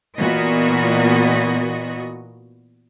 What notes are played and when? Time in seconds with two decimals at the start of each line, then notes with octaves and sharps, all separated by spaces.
0.17 A#2 E3 B3 F#4 D#5